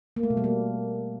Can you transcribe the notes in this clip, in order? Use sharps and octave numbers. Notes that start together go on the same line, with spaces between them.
A#3
A3
B2
G3
A#3